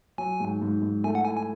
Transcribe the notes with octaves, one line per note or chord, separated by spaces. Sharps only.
F#3 G#5
G#2
G#2
G#2
A3 G#5
F#5
E4 G#5
G#5